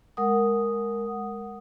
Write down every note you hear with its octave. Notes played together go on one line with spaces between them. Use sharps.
G#3 A#4 F#5 D#6